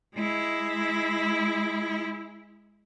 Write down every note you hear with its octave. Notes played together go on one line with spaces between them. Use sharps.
G#3 E4